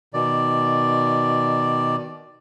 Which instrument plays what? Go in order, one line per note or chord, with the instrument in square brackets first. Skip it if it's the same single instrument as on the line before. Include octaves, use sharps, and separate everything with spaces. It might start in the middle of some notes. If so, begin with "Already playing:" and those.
[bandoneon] B2 D#3 D5